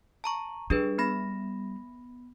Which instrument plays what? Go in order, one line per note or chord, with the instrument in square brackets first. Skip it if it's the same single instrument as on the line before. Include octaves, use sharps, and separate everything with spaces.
[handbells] A5 A#5 C#6
[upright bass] G3 [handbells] D4 G#4 B4
[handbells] B3 B5 A#6